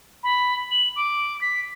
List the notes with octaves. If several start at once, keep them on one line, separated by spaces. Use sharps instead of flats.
B5
F#7
D6
B6